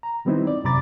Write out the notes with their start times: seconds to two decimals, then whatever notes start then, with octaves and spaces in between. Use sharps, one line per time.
0.03 A#5
0.25 D#3 G3 B3 C4 D#4 E4
0.47 D5
0.64 F#2 C3 A#5 B5 D6 A6